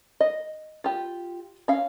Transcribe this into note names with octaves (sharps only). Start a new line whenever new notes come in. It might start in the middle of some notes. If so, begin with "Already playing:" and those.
D#5
F4 G4
C#4 F5